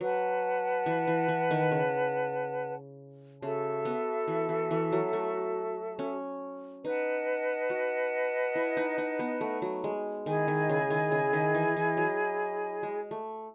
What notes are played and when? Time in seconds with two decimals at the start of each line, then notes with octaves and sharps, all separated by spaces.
0.01 F#3 B4 F#5 A5
0.86 E3
1.07 E3
1.28 E3
1.51 D#3
1.72 C#3
3.42 C#3 F#4 A4 E5 A5
3.85 B3
4.27 E3
4.49 E3
4.71 E3
4.92 F#3
5.13 A3
5.99 C#4
6.84 D#4 B4 D#5 F#5 A5
7.70 F#4
8.55 E4
8.77 D#4
8.98 D#4
9.19 B3
9.41 A3
9.62 F#3
9.84 G#3
10.26 D#3 E4 G#4 D#5 G#5
10.48 D#3
10.69 C#3
10.90 D#3
11.11 C#3
11.33 D#3
11.55 E3
11.76 E3
11.97 F#3
12.83 G#3
13.11 A3